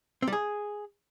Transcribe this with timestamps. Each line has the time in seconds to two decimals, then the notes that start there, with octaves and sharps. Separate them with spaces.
0.22 C4
0.28 G3
0.33 G#4